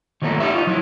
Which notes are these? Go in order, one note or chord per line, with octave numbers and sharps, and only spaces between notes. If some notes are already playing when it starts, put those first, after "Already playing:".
D#3 F3 F#3 A3 A#3
D#4 G4 E5
F4 C#5 D#5
F3 F#3 E4